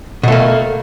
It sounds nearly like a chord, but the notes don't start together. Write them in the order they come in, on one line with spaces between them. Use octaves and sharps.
B2 A3 A#3